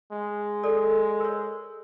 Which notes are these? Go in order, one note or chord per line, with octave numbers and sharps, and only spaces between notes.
G#3
A4 D5
A#4 C#5